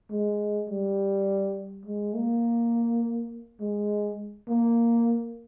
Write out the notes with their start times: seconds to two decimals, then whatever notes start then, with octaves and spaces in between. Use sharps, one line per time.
0.10 G#3
0.69 G3
1.85 G#3
2.14 A#3
3.60 G#3
4.48 A#3